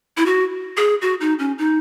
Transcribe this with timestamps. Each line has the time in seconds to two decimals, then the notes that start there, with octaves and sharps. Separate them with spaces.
0.17 E4
0.26 F#4
0.77 G#4
1.02 F#4
1.21 D#4
1.39 C#4
1.58 D#4